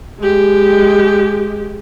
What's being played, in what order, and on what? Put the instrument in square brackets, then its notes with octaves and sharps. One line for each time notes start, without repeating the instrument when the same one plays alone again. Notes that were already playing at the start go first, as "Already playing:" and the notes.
[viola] G#3 G4